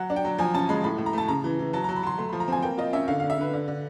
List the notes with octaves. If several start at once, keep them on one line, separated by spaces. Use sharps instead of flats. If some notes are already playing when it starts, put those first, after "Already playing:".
Already playing: F#3 F#5
D4
G5
F#3
F3 G#5
C#4 A5
G#3 B5
A2 B5
A2
A#5
A3 A5
C#3 A#5
E3
E3
F#3 A5
F#3 A#5
B5
F#3 C6
A3 C6
F3 B5
A#5
C4 G#5
A#3 G5
F4 D#5
C#4 E5
D3 F5
D3 F5
E5
D3 B4
D3
D3